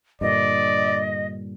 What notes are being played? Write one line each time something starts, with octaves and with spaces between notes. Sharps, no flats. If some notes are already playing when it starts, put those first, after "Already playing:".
G2 A#2 D3 D5 D#5